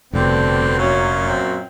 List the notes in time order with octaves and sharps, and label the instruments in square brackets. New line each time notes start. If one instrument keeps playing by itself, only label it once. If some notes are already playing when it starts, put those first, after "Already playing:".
[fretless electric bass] F1 [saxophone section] G2 B2 D3 [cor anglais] C4
[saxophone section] F#2 A#2 F#3 [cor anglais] C#4
[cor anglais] C4